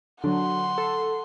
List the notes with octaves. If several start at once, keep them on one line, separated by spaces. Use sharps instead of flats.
D3 F#3 F#5 C6
A4